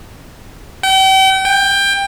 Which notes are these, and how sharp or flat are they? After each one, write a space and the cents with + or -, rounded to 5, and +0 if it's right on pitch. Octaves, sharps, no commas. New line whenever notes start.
G5 -40
G5 +20